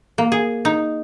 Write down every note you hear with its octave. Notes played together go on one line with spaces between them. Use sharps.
A#3
G#4
D#4